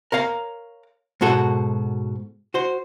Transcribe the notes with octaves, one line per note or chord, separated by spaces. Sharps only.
A#4 C#5 F5 A#5
G#2 B2 F#4 A4
F#4 C5